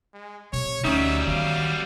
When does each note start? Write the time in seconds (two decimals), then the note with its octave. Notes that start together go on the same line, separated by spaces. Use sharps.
0.13 G#3
0.53 C3 C#5
0.84 D2 F#3 G3 C#4 D#4 E5
1.27 D#3 B3 F5